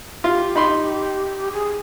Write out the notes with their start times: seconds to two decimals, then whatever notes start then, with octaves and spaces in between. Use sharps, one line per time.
0.24 F4 G4
0.56 D#4 B5 C6
1.53 G#4